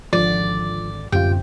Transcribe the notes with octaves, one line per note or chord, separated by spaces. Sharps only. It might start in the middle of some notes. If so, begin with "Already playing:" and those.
G#1 D3 F3 D5
D1 G1 F#2 C3 F4 G4 G5